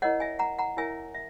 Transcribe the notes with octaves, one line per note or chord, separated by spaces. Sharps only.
E4 A#4 C#5 D#5 F#5
E5 G#5
F#5 A#5
F#5 A#5
E4 A#4 C#5 E5 G#5
E5